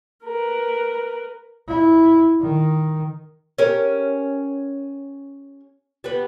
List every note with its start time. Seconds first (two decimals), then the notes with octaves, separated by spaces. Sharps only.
0.25 A#4 B4
1.68 E4
2.41 D#3
3.58 C#4 G4 A#4
6.04 G3 B3